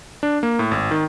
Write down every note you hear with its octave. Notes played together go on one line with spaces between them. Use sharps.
D4
A#3
A2
G#1
D#3